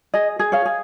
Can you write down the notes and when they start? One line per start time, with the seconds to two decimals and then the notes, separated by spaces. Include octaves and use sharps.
0.14 G#4 D#5
0.39 G#4
0.52 C#5 F5
0.65 G#4